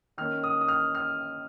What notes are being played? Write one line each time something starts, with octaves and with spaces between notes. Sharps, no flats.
D#3 A#3 C#4 F6
D#6
D#6
F6
F6